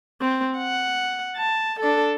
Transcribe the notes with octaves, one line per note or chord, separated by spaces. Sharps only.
C4
F#5
A5
D4 A4